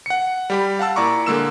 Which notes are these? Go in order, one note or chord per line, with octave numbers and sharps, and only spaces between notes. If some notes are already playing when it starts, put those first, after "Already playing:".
F#5 C#7
G3 G4 B5
F5 F#5 A5 E6
A#2 E4 D5 A#5 C#6 D6
D3 G#3 A#3 E6 E7